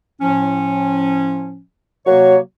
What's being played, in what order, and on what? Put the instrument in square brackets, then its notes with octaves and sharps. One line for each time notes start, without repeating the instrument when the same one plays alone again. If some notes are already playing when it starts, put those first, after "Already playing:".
[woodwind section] A2 F3 C#4
[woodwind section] C3 A#3 C#5 [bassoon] F#3